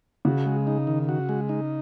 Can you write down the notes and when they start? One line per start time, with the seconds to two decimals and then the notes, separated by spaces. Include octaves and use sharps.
0.25 C#3 F#4
0.46 G#3
0.67 D#4
0.87 D#3
1.09 F#4
1.29 G#3
1.49 D#4